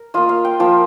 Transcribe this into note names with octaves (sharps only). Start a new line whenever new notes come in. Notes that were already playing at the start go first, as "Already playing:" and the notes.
Already playing: A#4
A#3 F4 D#5
F5
G5
F3 A#3 F4